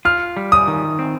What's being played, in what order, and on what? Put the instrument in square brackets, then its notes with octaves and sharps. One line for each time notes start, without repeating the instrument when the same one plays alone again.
[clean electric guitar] F4 [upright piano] F6
[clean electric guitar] G3
[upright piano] D#6
[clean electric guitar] D#3
C4